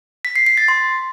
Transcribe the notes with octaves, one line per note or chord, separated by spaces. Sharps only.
B6
C7
C7
A6
C6